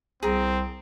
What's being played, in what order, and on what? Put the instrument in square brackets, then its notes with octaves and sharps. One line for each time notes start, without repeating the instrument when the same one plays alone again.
[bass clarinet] C2 [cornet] C4 [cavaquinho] G#4 A#5